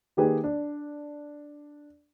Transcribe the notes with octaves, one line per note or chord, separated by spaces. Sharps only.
D#3 A#3 G4 G#4 B4
D4